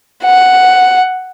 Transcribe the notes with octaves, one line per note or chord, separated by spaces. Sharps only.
F#5